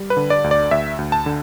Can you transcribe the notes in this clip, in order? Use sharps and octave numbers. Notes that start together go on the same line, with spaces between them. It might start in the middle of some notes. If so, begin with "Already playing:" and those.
Already playing: G3
B4
D3
D5
D2
D5
D2 E5
D2
A5
D3